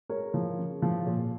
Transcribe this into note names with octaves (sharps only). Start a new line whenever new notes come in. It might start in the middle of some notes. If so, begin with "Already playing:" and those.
G#3 A#4 C#5
F3
C#3
F3
A#2